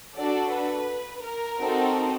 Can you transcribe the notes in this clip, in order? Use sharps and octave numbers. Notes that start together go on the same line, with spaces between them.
D4 F#4 A4 D5
B4
A#4
C4 D#4 F#4 A4